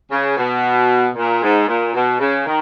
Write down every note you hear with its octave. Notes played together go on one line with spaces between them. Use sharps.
C#3
B2
A#2
G#2
A#2
B2
C#3
D#3